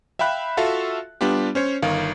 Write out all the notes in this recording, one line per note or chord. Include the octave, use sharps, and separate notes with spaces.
E5 F5 G5 B5 F#6
F4 F#4 A4 E5 F5
G3 B3 D4 F4 G4
C#4 C5 C#5
G1 D#3 F5